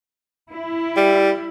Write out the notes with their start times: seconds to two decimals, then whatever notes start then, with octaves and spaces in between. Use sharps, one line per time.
0.52 E4
0.96 G3